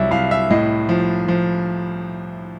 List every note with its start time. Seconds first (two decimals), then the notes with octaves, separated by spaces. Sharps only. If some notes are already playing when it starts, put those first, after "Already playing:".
Already playing: C2 F#3 E5
0.11 C2 F5
0.31 E5
0.51 A2 D#5
0.89 F3
1.28 F3